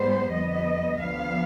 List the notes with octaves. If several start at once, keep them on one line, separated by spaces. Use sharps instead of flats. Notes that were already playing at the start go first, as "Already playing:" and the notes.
Already playing: G#2 G3 B3 C5
F2 D3 G3 B3 D#5
D2 D3 F3 B3 F5